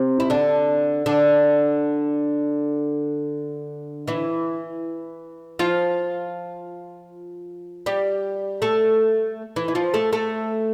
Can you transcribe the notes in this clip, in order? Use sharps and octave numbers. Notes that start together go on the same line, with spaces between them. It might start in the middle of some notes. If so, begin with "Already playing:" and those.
Already playing: C3 C4
E4
D3 D4
D3 D4
E3 E4
F3 F4
G3 G4
A3 A4
E3 E4
E4
F3 F4
A3 A4
A3 A4